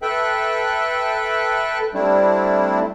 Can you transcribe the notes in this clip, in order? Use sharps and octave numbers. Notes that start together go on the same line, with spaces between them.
A4 B4 E5 G5 F#6
G3 A3 C4 D4 E4